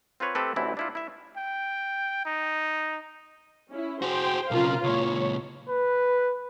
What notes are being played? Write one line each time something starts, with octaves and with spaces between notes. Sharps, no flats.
C4 F4 A#4 B4 C#5
A3 C4 G4 A4 B4
A1 D2 D3 E3 C4 E4
D4 E4 F4
E4 E5
G5
D#4
C#4 E4
F#4 G#4 C5 G5
B1 C#3 F4 A#4 F5
C#2 A#2 C#5
B4